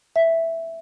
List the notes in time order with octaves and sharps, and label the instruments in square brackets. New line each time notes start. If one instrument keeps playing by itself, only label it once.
[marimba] E5